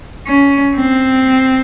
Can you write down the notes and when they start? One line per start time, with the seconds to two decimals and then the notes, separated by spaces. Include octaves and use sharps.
0.27 C#4
0.75 C4